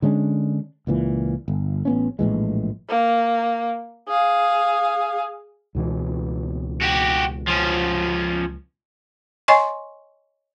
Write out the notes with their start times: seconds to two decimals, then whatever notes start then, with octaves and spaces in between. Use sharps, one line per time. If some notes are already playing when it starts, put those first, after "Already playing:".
0.02 D3 G#3 C#4 D4
0.87 C#2 A#2 E3
1.48 G1
1.85 A1 B3 C#4
2.19 A#1 A2 E3 G#3
2.89 A#3
4.08 G#4 F5
5.75 C#2 B2 E3
6.82 F#4 G4
7.48 F3 C#4
9.48 C#5 D#5 G#5 C6 C#6